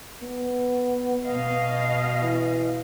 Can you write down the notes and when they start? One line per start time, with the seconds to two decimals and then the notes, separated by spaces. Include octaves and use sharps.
0.22 B3
1.25 B2 D#5 F5
2.22 E3